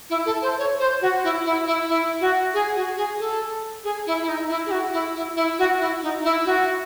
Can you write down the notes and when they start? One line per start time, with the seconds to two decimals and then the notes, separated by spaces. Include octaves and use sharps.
0.10 E4
0.26 A4
0.42 C5
0.59 C#5
0.80 C5
1.02 F#4
1.24 E4
1.45 E4
1.66 E4
1.88 E4
2.21 F#4
2.54 G#4
2.76 F#4
2.97 G#4
3.19 A4
3.84 G#4
4.07 E4
4.22 E4
4.28 D#4
4.49 E4
4.66 G#4
4.71 F#4
4.93 E4
5.15 E4
5.36 E4
5.59 F#4
5.80 E4
6.02 D#4
6.24 E4
6.46 F#4